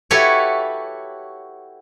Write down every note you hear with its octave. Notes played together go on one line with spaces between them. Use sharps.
E4 F#4 G4 A4 B4 C#5